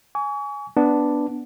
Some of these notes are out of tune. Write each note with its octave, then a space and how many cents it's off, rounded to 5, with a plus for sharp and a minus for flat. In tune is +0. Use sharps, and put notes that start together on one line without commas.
G#5 +0 C#6 +40
B3 +0 D4 +0